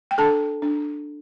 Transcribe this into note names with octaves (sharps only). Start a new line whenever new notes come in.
G5
D4 A4 A5
D4